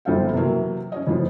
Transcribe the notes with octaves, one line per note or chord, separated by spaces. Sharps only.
G1 F#2 F3 A4 F5 G5
C3 E3 F#3 A#3
C#4 C#5 D#5
F2 A2 E3 F3